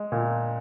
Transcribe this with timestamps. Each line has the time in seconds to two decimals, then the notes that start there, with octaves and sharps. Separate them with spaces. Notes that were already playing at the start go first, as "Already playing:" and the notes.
Already playing: G#3
0.12 A#2